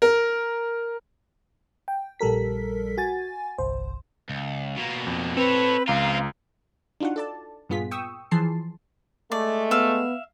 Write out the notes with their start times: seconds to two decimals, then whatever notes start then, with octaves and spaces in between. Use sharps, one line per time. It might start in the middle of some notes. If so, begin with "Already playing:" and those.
0.02 A#4
1.88 G5
2.19 A#1 G3 A4 A#4 B6
2.97 F#4 G#5 A6
3.58 G1 C2 C5
4.29 C#2
4.76 B2 A#3
5.07 F2
5.37 C4 A4 B4 C#5
5.88 C#2 C4 F4 F5 A#5
7.00 D4 D#4 F4 F#4 F#5
7.16 A4 D5 A5
7.69 G2 A#2 B3 F4 G#4 B6
7.91 G5 C#6 D#6 E6
8.31 E3 F3 G#4 A5 C6 C7
9.32 G#3 A3 D5
9.71 B3 E5 F5